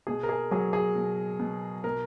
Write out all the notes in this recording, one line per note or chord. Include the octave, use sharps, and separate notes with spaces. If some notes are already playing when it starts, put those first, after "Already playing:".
B2 G#4
A#4
G#4
F#3 G#4
G#4
B2
B2
B2 A#4